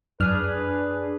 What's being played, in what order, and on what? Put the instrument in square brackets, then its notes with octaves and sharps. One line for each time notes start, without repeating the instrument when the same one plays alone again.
[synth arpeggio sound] F#2 F6 [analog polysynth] D4 G#4 [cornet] B4